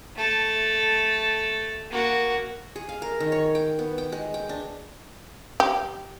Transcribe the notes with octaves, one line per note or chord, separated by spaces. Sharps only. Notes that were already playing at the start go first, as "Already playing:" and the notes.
A3 A4
A#3 F#4
G#4
F5
A#4
D#3
C#5
G5
B3
G5
G#3
G5
D4
G4